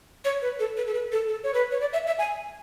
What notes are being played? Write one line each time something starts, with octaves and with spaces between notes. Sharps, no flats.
C#5
B4
A4
B4
A4
B4
A4
A4
C#5
B4
C#5
D5
E5
E5
G#5